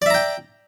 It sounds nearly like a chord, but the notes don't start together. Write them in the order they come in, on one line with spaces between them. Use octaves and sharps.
D5 E5 A#5 G5